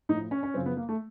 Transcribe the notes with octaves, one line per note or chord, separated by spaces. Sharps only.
A2 F3 D#4
C#4
C#4
F#2 C#3 F3 C4
B3
A#3
A3